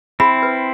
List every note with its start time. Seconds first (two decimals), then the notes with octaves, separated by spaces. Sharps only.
0.20 C4 E4 B5
0.43 B4